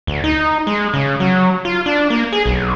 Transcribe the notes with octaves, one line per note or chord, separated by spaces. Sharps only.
D2
D#4
G#3
C#3
F#3
F4
D4
A#3
G#4
B1